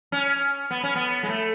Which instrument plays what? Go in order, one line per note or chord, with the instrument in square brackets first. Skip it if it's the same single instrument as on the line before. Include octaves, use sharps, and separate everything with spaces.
[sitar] C#4
B3
C#4
B3
G#3
A3